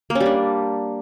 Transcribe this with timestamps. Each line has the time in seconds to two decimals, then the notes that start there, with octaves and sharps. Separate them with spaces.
0.10 A#3
0.15 C#4
0.20 G3
0.26 D4